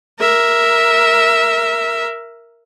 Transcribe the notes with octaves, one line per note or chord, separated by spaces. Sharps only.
A#4 E5